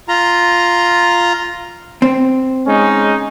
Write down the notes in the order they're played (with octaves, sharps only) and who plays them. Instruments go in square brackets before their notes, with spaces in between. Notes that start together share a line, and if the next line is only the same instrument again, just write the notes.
[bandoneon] F4 A#5
[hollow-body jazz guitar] C4
[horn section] G#3 C#4 D#4